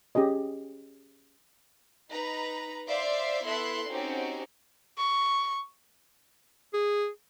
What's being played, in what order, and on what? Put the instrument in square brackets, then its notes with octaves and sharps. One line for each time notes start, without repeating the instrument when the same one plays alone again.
[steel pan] C#4 G4 G#4 D#5
[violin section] D#4 B4 A#5
C5 D5 E5 F5 C6 D6
B3 E4 A4 E5 C6 F#6
C4 C#4 D#4 F#4 G4
[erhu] C#6
[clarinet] G#4